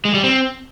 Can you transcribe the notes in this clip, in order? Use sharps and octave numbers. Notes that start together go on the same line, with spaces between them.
G#3
G3
C4